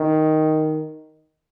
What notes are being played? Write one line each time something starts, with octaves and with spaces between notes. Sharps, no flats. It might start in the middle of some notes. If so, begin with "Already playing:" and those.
Already playing: D#3